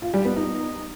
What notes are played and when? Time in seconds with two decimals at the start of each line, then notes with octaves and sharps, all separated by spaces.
0.02 F4
0.14 G3
0.25 B3
0.37 D#4